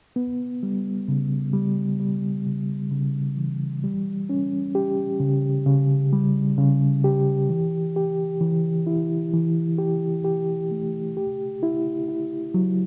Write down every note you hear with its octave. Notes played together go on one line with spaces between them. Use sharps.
B3
G3
C#3
G3
G3
C#3
C#3
E3
G3
C#4
G4
C#3
C#3
G3
C#3
G4
E3
G4
E3
E4
E3
G4
G4
A3
G4
E4
E4
F#3